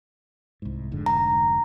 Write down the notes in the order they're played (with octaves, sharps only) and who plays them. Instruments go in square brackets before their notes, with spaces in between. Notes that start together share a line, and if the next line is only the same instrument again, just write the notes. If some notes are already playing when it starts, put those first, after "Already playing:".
[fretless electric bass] C2 G#2
F1 G#2 D3
[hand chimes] A#5